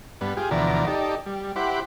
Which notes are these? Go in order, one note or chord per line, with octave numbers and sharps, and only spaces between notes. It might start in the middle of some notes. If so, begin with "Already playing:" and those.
G2 B3
F4 G4 G#4
D2 B2 E3 F3 D5 A#5
D#4 G4 A4 D5
G3
E4 G4 C5 F#5 B5 D6